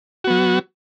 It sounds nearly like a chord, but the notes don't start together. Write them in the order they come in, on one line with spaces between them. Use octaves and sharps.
F#4 B3 F#3